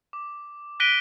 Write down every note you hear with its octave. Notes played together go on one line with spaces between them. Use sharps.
D6
F#6 A#6 B6 D7 D#7 G7